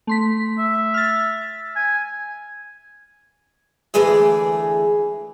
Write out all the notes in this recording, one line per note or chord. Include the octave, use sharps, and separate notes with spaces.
A3 C6 B6
E5
F6 A6
G#5
D2 E3 G#3 A3 G#4 D5